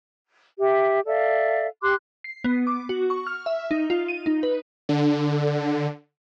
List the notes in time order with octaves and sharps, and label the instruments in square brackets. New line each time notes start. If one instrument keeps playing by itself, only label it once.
[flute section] G4 E5
A4 D5 E5 F5
G4 C6 D6 F#6
[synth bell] C7
B3
D6
F#4
C#6
F6
E5
D#4
F4
D#7
D#4
B4
[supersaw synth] D3